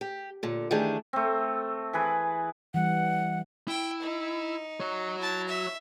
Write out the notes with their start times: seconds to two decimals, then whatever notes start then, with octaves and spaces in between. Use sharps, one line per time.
0.01 G4
0.43 A#2 D3
0.71 D#3 E3 A3 D4 G4 G#4
1.13 A3 C4
1.93 E3 G#4 B4
2.74 E3 G3 F#5
3.68 E4 G5
4.02 D#4
4.80 F#4 C#5
5.19 E4 A5
5.48 E5